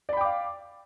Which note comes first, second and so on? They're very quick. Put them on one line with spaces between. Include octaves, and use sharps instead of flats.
D5 B5 G5 D6 F5